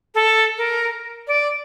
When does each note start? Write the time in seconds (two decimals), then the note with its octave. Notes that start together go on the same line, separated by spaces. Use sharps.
0.15 A4
0.58 A#4
1.27 D5